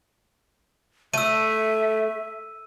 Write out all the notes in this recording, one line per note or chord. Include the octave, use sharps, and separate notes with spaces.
A3 E5 E6 D#7